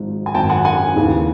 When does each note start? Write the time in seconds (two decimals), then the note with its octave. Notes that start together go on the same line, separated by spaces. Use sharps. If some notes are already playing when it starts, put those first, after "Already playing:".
Already playing: G#1 G#2 F3
0.26 G#5
0.34 G#1 F#2 D#3 G5 A5
0.49 F#5 G#5
0.65 F#5 G#5
0.96 D#2 C#3 E3